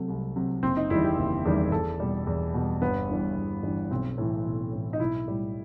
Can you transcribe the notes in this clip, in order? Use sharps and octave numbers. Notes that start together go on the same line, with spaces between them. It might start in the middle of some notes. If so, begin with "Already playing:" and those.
Already playing: C3 F#3 A3
C2
C3 F#3
F#1 C4
D#4
E2 D#3 G3 E4
G4
F#1
E2 D#3 G3
E2 A4
B2 G3
E2
B2 G3
G1 B3
G2 E3 G3
G1
G2 E3 G3
B1 C4
A2 E3
B1
A2 E3
D#4
B1 E4
A2 G3